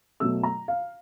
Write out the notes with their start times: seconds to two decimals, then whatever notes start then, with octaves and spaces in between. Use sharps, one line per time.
0.20 B2 F#3 A3 E6
0.43 A#5
0.68 F5